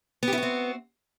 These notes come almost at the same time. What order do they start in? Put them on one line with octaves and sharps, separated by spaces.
B3 G4 E4 F#4 C4